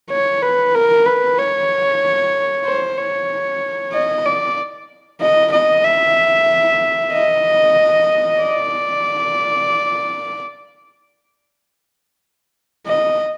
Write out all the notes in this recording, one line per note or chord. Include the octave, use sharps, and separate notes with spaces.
C#5
B4
A#4
B4
C#5
C5
C#5
D#5
D5
D#5
D#5
E5
D#5
D5
D#5